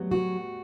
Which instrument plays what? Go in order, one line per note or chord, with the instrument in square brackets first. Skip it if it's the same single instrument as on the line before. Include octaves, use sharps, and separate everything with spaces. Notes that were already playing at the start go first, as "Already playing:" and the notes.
Already playing: [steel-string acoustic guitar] F#3 [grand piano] G3 A3 B3
[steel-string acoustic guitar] F#4